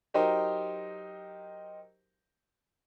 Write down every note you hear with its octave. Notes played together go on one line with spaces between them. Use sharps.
F#3 D#4 G4 A#4 C5 D#5